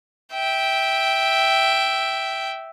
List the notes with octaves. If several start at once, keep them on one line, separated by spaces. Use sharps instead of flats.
E5 G5